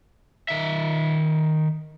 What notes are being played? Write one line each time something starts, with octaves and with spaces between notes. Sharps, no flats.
D#3 E5